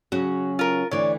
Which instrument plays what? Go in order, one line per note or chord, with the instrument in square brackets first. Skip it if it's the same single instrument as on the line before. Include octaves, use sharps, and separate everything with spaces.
[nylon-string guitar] C#3 F#3 C#4 [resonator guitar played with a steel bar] F#4
[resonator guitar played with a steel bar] F4 A#4
[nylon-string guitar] D2 D3 E3 [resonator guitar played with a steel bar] C#5 D5